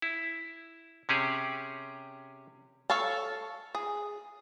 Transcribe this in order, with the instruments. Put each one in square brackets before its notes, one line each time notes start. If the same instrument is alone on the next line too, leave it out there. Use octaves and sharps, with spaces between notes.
[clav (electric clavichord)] E4
C3 C#4 G4 G#4
[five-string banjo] A4 C#5 F5 A5
G#4